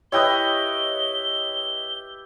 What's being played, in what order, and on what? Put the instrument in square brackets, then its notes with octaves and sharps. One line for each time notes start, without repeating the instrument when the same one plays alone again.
[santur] E4 G4 B4 [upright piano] C#5 D#5 D#6 [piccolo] G7